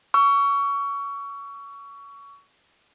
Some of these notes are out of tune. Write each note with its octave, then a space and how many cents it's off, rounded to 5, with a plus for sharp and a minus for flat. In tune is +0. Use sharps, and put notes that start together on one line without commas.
C#6 +20 E6 +30